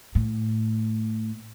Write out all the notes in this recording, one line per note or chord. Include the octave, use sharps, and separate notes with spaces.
A2